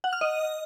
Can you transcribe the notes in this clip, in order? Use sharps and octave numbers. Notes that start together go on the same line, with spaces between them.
F#5
F6
D#5